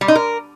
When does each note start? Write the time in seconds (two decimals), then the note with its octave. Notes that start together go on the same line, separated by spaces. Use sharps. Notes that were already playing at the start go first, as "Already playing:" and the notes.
0.01 G3
0.08 D#4
0.15 A#4